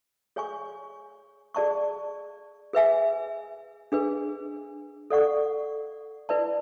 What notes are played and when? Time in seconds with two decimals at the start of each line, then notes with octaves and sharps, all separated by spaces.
0.36 G#4 C#5 G#5 C#6
1.55 G#4 D5 A5 C#6
2.73 G#4 B4 E5 G#5
3.92 D4 G#4 B4
5.10 A4 D5 F#5 C#6
6.29 E4 B4 D5 A5